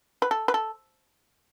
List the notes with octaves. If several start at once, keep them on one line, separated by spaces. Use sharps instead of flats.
B4
A4
B4
A4